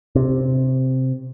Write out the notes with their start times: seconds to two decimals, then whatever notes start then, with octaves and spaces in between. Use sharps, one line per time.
0.16 C3